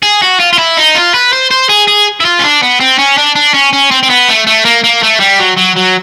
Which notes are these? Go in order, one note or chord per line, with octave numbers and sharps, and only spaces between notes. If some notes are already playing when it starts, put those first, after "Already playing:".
G#4
F#4
F4
F4
E4
D#4
F4
B4
C5
C5
G#4
G#4
E4
F4
C#4
D4
B3
C4
C#4
D4
D4
C#4
C#4
C4
C4
B3
A3
A3
A#3
A#3
A3
G3
F#3
F#3
F#3